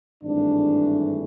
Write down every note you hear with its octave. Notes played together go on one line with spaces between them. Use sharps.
G#1 G2 E3 A3 D4